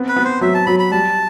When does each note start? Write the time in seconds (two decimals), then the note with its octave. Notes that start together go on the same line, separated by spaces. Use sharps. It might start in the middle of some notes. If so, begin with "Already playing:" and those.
Already playing: B3 C4
0.09 B4
0.16 B3
0.25 C5
0.41 F#3 E5
0.54 A5
0.66 F#3 B5
0.80 B5
0.91 G3 A5